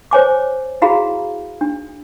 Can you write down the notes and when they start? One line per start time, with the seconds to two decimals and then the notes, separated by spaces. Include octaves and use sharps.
0.11 C5 C#5 G#5 D6
0.82 E4 F#4 G#4 F5 A#5 B5
1.61 D4